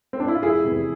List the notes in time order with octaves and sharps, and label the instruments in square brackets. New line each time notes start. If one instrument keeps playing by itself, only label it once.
[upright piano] C4
D4
E4
F4
F1 E4 G#4
E2 C3 E3